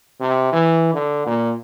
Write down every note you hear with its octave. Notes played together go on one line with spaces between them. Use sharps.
C3
E3
D3
A#2